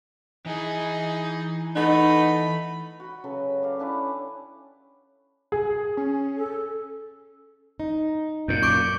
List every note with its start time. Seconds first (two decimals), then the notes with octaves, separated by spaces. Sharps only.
0.46 E3 D#4 G#4
1.76 A3 B3 D#4 B5
3.00 F#4 B5
3.24 C#3 F#3 A4 B4
3.63 G4 D5 F5
3.79 C#4 D4 E4 B4
5.52 G#4
5.97 C#4
6.37 A4
7.80 D#4
8.48 F#2 A#2 G6
8.63 C#6 D6 D7